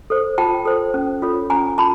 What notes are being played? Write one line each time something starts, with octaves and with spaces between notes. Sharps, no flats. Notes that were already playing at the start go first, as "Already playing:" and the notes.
A4 C5
F4 G5 A5
A4 C5
C#4
F4 A4 C#5
C#4 G#5 A#5
F4 A5 B5